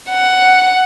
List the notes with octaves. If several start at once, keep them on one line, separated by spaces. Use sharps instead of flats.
F#5